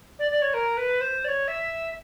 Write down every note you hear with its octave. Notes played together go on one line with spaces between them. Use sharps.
D5
D5
C#5
A#4
B4
C5
D5
C#5
E5